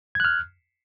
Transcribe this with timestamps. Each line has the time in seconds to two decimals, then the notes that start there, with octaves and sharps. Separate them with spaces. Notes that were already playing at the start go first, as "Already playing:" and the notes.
0.15 G#6
0.20 F#6
0.25 F6